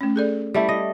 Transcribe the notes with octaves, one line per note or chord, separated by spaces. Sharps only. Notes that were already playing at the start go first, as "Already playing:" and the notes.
A3 C#4
G#4 A4 D5
G3 A3 E4
D#5